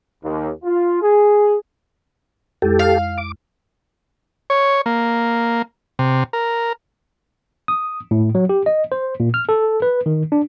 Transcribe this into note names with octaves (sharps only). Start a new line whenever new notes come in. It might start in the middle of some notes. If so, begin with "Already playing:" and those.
D#2
F4
G#4
F2 G#3 E4 G4 A4
F5
D6
C#5
A#3
C3
A#4
D#6
A2
F#3
G4
D#5
C5
A#2
F6
A4
B4
D#3
D4